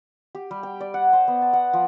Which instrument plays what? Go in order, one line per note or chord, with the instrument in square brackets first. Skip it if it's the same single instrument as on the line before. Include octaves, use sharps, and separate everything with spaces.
[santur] G4
G3
G5
D5
F#5
C5
B3
A5
F#5
F3